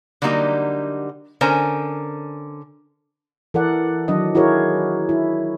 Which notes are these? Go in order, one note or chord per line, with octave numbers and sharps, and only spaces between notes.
D3 F#3 G3 A#3 D#4 G4
D3 C#4 A#4 C5 G#5
E3 A4 A#4 D5 F#5
D#3 F#3 D4 D#5
E4 F#4 G#4 A#4 C#5
E4